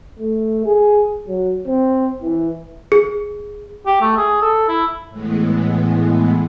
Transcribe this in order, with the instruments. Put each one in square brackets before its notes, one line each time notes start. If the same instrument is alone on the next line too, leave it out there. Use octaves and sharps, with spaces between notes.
[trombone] A3
G#4
F#3
C4
E3
[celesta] G#4
[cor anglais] G4
A3
G#4
A4
E4
[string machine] A2 E3 G#3 B3